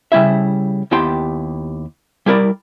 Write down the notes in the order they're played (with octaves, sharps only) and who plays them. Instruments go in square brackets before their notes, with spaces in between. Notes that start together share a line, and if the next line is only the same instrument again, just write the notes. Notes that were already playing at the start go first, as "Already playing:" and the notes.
[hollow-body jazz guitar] C#3 G3 E4 E5
D#2 B3 E4 G4 G5 C6
G3 E4 A#4 D5